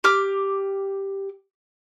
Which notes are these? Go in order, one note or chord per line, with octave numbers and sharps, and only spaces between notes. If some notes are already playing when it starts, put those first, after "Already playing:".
G4 D6 F6